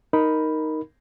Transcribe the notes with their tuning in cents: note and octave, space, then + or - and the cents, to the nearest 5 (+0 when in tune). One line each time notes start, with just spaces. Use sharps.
D#4 +5 A#4 +0 B5 +0